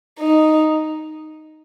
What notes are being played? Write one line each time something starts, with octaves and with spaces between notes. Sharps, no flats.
D#4